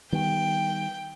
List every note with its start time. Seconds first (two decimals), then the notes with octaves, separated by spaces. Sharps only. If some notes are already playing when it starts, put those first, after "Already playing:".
0.12 D#3 G3 B3 G5